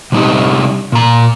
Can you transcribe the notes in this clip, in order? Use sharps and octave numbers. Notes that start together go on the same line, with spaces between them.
C3 G3 D4 D#4 G4
A#2 A#5